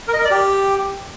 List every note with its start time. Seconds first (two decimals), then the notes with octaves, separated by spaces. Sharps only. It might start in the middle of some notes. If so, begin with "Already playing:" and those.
0.08 A#4
0.13 D#5
0.19 A#4
0.25 D5
0.30 G4